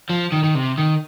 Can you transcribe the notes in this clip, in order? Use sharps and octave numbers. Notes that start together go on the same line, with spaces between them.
F3
D#3
D#3
C3
D#3